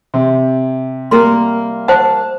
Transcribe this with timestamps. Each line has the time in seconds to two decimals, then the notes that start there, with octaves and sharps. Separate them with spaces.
0.14 C3
1.11 G3 A#3 A#4 C6
1.88 C5 F#5 A5